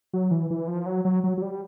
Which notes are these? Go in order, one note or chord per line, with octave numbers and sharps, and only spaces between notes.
F#3
E3
E3
F3
F#3
F#3
F#3
F#3
G3